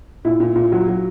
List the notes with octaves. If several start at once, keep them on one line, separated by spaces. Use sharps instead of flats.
A#2 E4
A#2
A#2
F#3
F#3